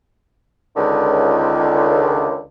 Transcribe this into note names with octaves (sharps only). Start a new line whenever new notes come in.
C#2 D3 D#3